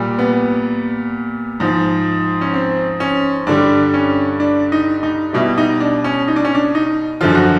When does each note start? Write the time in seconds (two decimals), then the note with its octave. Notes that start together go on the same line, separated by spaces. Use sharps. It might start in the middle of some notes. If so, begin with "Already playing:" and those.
Already playing: A#2 G3
0.19 B3
1.60 G#2 F3
2.41 C#4
2.54 C4
3.00 C#4
3.47 G2 D3 G3 D4
3.94 C#4
4.40 D4
4.72 D#4
5.03 D#4
5.33 B2 G3 E4
5.58 D#4
5.80 D4
6.04 C#4
6.28 D#4
6.36 D4
6.45 C#4
6.55 D4
6.75 D#4
7.21 F#2 D3 F3 F4
7.35 F#4